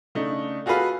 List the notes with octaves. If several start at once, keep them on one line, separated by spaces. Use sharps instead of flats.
C#3 A3 D4 D#4
F4 F#4 G#4 A4 B4 F5